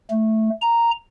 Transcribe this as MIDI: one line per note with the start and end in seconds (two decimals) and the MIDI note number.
0.11 0.49 57
0.61 0.91 82